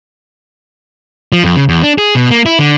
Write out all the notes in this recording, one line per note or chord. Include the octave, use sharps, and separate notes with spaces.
F3
F2
C#3
E2
D4
G#4
B2
A#3
E4
D3